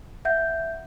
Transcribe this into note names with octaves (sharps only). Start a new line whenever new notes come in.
E5 F#5 G6